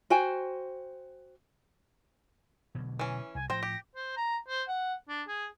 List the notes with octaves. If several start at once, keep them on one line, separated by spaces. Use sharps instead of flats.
F#4 C5 G5 G#5
B2 D3 F#3
E3 C#4
C2 G#5
A2 F3 C5 G5 A#6
G4
C5
A#5
C5
F#5
D4
G#4